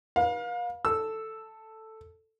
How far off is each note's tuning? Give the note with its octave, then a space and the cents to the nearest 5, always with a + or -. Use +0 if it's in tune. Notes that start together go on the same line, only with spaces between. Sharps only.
B4 -40 F5 +30
A4 +5 E6 +0